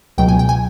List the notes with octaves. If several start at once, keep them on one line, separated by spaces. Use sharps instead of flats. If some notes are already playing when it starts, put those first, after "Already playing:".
C#2 B2 F#3 G5
G#5
G5
G#5